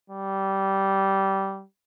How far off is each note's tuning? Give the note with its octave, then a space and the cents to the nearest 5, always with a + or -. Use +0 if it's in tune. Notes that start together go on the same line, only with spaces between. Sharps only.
G3 -15